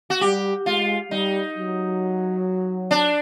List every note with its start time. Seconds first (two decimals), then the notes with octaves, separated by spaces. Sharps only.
0.10 F#4
0.21 G3 G4
0.66 G#3 F4
1.11 G3 D#4
1.57 F#3
2.91 D4